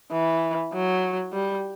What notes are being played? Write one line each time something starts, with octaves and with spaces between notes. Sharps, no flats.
E3
F#3
G3